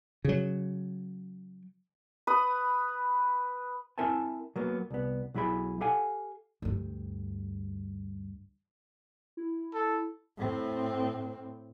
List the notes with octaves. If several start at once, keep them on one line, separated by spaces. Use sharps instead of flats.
C#3 F#3
B4 D#6
C4 E4 A#4 E5 G#5 A5
F#3 A#3 B3
C2 B3
B1 F#3 E4 G#4 B5
G4 A4 F5 F#5 G#5
D2 G2
E4
A4
A2 C4